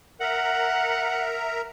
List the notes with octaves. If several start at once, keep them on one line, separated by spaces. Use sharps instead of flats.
A#4 E5 F#5 A#5